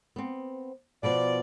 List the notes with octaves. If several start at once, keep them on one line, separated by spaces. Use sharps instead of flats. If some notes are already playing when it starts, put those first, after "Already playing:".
B3 C4
B2 F3 B4 D5